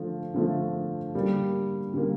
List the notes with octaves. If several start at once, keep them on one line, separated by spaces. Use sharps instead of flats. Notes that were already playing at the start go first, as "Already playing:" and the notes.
Already playing: D3 F3 A3
D3 F3 A3
D3 G3 A#3
D3 G3 A#3